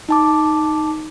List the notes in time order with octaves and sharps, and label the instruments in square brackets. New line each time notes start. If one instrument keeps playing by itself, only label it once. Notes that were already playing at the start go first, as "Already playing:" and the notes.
[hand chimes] D#4 A5 D6